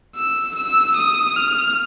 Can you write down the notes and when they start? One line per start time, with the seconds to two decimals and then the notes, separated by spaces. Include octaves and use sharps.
0.16 E6
0.56 E6
0.97 D#6
1.37 F6